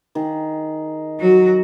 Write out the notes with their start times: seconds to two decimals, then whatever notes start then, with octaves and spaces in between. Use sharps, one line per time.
0.15 D#3 G#4
1.20 F#3 F#4